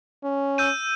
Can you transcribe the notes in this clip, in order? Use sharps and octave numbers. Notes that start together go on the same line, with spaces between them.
C#4
E6 G6 D#7